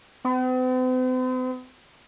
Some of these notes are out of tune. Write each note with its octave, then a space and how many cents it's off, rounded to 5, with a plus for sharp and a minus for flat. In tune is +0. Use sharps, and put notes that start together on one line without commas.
C4 -45